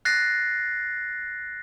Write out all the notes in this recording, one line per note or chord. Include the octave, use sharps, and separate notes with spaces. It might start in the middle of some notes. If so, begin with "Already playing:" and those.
F#6 A6 A#6 C7